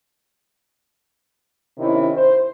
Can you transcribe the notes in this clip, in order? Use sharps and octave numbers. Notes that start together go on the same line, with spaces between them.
C3 D#3 C#4 D#4 E4
C5